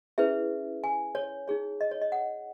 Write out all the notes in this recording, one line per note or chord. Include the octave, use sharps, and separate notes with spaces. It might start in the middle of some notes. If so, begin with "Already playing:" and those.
C#4 E4 G#4 B4 E5
G#5
C#5
D#4 G#4 C#5
D#5
C#5
D#5
F#5